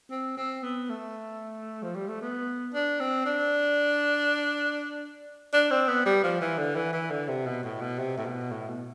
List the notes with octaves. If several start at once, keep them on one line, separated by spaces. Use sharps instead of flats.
C4
C4
B3
A3
F3
G3
A3
B3
D4
C4
D4
D4
C4
B3
G3
F3
E3
D3
E3
E3
D3
C3
B2
A2
B2
C3
A2
B2
A2
B2